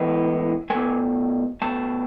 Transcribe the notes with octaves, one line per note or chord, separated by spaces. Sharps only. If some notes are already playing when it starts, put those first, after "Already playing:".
Already playing: A2 E3 G#3 B3
B2 A3 G#5
B2 A3 A5